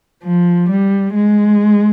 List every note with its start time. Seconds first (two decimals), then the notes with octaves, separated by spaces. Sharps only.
0.24 F3
0.69 G3
1.15 G#3